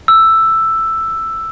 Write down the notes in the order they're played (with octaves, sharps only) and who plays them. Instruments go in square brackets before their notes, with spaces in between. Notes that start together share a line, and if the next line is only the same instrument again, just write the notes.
[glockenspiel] E6